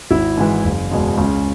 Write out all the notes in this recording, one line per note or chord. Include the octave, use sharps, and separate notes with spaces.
G#1 E4
G#2 E3
F#1
E2 B2 G#3
C#2 C#4